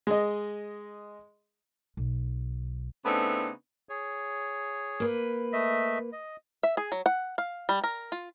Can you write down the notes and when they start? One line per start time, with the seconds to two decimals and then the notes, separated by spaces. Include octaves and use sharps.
0.07 G#3 D#5
1.97 B1
3.05 C#3 A3 B3 C4 D4 D#4
3.89 G#4 C#5
5.00 A#3 B4
5.53 A3 D#5 E5
6.12 D#5
6.63 E5
6.77 G#4
6.92 F#3
7.06 F#5
7.38 F5
7.69 G3
7.84 A#4
8.12 F4